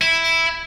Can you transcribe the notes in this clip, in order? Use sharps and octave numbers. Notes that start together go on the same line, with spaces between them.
E4